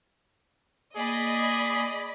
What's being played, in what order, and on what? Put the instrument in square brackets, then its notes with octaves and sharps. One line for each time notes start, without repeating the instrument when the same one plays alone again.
[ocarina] A#3 [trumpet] G#4 [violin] D5 B5 [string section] D#5